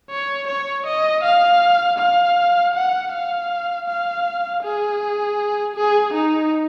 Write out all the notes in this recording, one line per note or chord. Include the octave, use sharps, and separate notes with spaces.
C#5
C#5
D#5
F5
F5
F#5
F5
F5
G#4
G#4
D#4